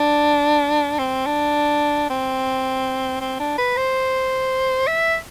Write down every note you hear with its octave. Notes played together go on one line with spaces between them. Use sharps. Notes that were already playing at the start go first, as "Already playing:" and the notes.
Already playing: D4
C4
D4
C4
C4
D4
B4
C5
E5